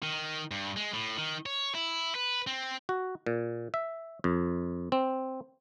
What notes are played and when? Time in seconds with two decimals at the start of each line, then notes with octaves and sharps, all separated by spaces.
0.03 D#3
0.51 G2
0.76 G#3
0.93 A2
1.18 D#3
1.46 C#5
1.75 E4
2.15 B4
2.47 C4
2.89 F#4
3.26 A#2
3.74 E5
4.24 F2
4.92 C4